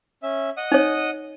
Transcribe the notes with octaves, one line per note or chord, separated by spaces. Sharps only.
C#4 E5
D#5 F#5 D#6
D#4 C#5